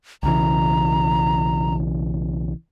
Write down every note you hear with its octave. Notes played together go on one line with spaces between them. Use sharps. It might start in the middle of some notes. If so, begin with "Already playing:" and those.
B1 C#3 E3 A#5